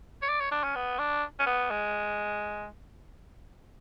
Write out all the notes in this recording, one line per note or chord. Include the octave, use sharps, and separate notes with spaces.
C#5
D5
C#5
D4
C#4
B3
D4
C#4
B3
G#3